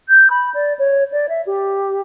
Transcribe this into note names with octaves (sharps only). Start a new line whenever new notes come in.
G6
B5
D5
C#5
D5
E5
G4